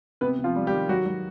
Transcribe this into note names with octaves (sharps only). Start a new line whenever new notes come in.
C3 B3 B4
C3
F3 F4
G3
G3 G4
D#3
F#3 F#4
F#3